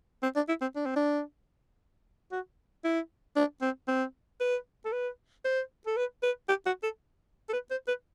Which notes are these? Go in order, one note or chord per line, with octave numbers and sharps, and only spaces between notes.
C4
D4
E4
C4
D4
C4
D4
F#4
E4
D4
C4
C4
B4
A4
B4
C5
A4
B4
B4
G4
F#4
A4
A4
B4
C5
B4